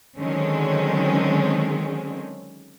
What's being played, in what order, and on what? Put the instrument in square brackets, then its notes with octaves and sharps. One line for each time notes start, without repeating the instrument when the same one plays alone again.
[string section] D3 D#3 F#3 G#3 C4 C#4